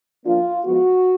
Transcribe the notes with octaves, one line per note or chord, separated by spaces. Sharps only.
F3 A#3 D4 F4
F3 G#3 B3 F#4